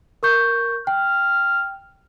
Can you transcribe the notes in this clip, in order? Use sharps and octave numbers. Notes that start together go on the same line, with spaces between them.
A#4 C#6 G6
G5 F6